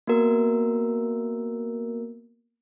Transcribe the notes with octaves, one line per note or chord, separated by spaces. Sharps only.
A#3 B3 F#4 A#4